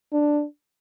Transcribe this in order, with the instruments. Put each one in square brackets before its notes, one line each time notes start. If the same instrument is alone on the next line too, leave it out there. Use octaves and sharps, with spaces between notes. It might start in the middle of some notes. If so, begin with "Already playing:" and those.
[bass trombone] D4